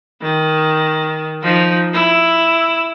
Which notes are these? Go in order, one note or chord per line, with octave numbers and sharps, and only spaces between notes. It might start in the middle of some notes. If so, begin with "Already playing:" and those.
D#3
F3 D#4
E4